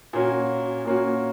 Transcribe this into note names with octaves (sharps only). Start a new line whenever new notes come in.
A#2 A#3 C#4 F#4
A#2 A#3 C#4 F#4